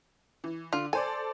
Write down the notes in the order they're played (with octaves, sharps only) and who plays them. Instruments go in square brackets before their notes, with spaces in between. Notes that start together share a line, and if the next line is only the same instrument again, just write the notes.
[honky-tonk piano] E3
[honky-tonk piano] D3 [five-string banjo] F4
[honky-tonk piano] A4 C5 D5 [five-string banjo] G#5